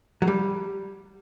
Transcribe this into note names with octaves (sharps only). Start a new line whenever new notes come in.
F#3
G3